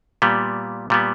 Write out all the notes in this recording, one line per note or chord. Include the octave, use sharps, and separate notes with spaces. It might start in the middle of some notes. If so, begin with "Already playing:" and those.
A#2 G3 B3
A#2 G3 B3